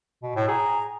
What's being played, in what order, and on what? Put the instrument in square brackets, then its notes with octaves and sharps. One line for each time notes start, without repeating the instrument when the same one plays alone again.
[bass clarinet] B2
A2
[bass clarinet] G#4 [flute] A#5